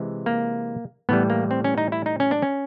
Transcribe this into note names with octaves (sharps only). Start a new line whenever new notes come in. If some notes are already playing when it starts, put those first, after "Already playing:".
Already playing: C3 E3 G#3
A#3
A2 E3 G3 B3
A#3
C4
C#4
D#4
E4
D#4
C#4
D4
C#4